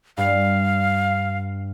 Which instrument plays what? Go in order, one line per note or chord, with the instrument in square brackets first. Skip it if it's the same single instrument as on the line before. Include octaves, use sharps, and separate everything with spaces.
[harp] G2 [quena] F5